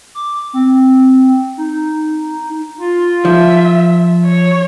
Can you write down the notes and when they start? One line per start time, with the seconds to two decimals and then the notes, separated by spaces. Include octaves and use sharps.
0.15 D6
0.53 C4
1.57 D#4
2.79 F4
3.25 F3 E5
4.26 C#5